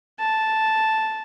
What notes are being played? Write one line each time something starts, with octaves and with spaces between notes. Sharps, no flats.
A5